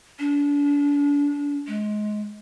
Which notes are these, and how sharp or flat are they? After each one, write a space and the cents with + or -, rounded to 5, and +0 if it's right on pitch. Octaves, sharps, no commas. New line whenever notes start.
D4 -35
G#3 +25